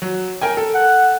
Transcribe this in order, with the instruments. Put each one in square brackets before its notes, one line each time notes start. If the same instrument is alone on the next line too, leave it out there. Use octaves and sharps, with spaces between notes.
[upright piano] F#3
A#4 G5 G#5
A4
[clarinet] F#5